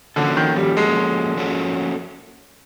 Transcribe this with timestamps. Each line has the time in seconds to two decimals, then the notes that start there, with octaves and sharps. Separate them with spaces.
0.16 D3 F3 A#3 C#4 F#4 A4
0.37 D#3
0.56 G3
0.76 F3 G#3 A#3 C#4 F#4 A4
1.36 F3 A#3 C#4 F#4 A4